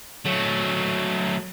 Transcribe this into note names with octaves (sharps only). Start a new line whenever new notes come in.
F#3 A3